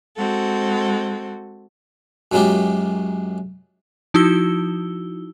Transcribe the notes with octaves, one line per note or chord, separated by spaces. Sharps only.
G#3 C4 F#4 A4
F#2 F#3 G#3 A#3 F4 G4
F3 D#4 E4 F#4 E6 G7